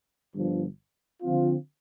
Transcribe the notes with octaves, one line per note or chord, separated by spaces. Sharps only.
G1 G2 D3 F3
D3 F3 C4 F4